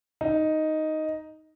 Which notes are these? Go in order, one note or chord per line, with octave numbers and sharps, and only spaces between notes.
D#4